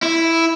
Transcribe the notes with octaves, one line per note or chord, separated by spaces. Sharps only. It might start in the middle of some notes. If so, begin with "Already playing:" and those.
E4